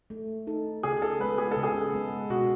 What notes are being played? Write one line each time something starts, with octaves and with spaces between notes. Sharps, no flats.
A3
D#4 A4
C#3 G#4
A4
G#3 B3 B4
G#4
A4
C#3
G#4
G#3 B3
B2 F#4